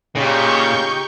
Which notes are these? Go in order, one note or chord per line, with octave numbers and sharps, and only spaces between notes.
A#2 C#3 D#4 G4 C#6 G6